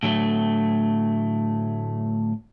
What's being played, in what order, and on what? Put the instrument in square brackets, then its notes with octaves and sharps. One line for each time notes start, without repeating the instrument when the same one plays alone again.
[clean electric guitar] A2 D3 F#3 G3 A3